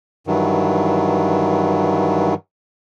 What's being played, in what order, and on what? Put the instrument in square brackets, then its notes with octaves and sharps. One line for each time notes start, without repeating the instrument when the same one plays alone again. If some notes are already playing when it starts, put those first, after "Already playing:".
[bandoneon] G2 D#3 E3 F#3